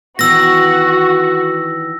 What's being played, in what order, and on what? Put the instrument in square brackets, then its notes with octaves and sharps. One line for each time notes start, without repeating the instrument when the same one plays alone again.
[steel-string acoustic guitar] D#3 E3 B3 [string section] F#4 [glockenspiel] E6 A#6